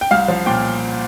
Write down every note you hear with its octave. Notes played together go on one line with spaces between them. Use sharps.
G5
C2 F5
F3
A#2 G5